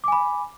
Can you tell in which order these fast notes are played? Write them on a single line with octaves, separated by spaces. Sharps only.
D6 G#5 B5